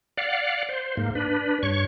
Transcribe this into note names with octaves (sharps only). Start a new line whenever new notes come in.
D5 F5 F#5
C5
G#2 A#3
D4 B4
G2 C#5 C#6